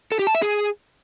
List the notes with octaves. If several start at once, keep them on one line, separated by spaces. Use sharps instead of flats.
A4
G4
A5
E5
G#4